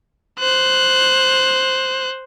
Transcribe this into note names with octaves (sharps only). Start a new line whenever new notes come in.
C5 F#6